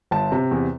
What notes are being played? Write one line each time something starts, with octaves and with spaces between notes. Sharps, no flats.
G1 A5
C3
E2